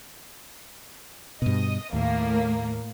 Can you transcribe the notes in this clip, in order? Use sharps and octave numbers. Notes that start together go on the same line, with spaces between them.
G2 B2 D#5
D#2 A2 A#3